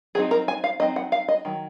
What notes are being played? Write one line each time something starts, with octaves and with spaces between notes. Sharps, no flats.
F#3 C4 D#4 G#4
A#4
G#5
F5
F#3 C4 D#4 D#5
F#5
F5
D#5
D#3 F#3